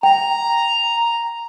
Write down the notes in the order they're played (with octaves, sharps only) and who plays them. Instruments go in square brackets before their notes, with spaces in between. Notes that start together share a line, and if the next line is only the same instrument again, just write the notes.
[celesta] G5 [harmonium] A#5